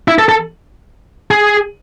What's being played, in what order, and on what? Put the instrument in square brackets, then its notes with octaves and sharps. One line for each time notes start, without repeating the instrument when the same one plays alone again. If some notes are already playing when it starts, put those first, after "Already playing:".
[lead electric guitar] E4
A4
A4
G#4